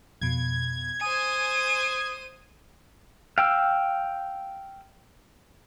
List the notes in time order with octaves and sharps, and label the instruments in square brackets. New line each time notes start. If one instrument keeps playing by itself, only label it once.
[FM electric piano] F2 B2 [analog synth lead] G#6
[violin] C5 D#7 [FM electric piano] G#5 [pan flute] D#6
[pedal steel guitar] F5 G5 E6